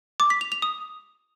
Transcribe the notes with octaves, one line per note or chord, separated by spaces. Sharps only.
D6
B6
F7
F7
D#6